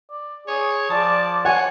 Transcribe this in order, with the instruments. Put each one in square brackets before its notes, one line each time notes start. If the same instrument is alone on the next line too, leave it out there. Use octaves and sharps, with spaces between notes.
[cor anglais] D5
[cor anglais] G#4 [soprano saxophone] C#5
[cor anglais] F3 [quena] D5 [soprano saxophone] A5
[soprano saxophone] C#5 [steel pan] F#5 G#5